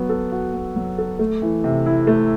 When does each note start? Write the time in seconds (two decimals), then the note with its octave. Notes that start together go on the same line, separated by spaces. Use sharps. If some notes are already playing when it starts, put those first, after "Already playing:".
Already playing: F#3 B3 F#4
0.09 A4
0.32 F#4
0.53 B3
0.76 F#3
0.98 A4
1.19 A3
1.42 E3
1.64 C3
1.86 E4
2.07 A3